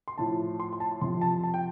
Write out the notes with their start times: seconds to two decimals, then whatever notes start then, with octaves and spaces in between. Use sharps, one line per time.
0.08 C6
0.18 A2 F3 A5
0.60 C6
0.73 C6
0.80 A5
1.01 F2 C3 F3 C6
1.21 A5
1.43 A5
1.54 G5